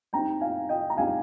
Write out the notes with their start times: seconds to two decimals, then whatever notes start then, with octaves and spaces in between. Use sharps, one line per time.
0.13 G3 C4 D#4 G5 A#5
0.41 F5 G#5
0.69 D#5 G5
0.90 A#5
0.97 G3 C4 D#4 F5 G#5